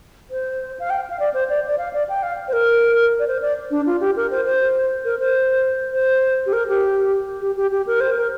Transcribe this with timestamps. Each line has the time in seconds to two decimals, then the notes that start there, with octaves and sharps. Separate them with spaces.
0.31 C5
0.80 F5
0.90 G5
1.10 F5
1.20 D5
1.34 C5
1.50 D5
1.67 D5
1.78 F5
1.93 D5
2.09 G5
2.23 F5
2.48 C5
2.53 A#4
3.19 D5
3.28 C5
3.42 D5
3.71 D4
3.86 F4
4.00 G4
4.16 A#4
4.31 C5
4.45 C5
5.05 A#4
5.19 C5
5.93 C5
6.46 G4
6.53 A#4
6.68 G4
7.41 G4
7.57 G4
7.72 G4
7.87 A#4
8.01 C5
8.16 A#4